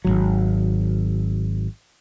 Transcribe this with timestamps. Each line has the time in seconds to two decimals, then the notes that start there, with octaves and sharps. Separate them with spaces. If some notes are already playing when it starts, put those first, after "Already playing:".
0.05 G#1 C#2 F#3